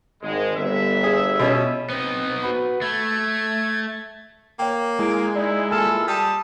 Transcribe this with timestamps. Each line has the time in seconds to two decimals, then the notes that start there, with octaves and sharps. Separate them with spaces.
0.22 G#1 G#3
0.56 G1 E5
1.04 G#4
1.39 B2 C#4
1.90 B3 C4 D#4
2.43 F#4 B4
2.81 A3 G#6
4.59 A#3 C#5 G5
4.99 G#3 E4 D7
5.35 D#4 E4 D5
5.71 A#2 E4 A4 G#5 F6 E7
6.08 G3 A5 D#6